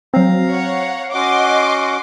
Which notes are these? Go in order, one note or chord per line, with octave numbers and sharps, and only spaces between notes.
F#3 C4 F5 A#5
C#5 F#5
C#4 F#4 D#5 F#5 C6 D6